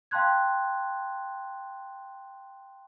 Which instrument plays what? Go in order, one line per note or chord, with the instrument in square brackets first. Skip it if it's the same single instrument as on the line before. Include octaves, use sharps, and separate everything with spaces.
[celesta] F5 G5 A5 C6 F#6 G#6